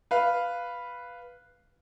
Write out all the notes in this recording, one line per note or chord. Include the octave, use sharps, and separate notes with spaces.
B4 F5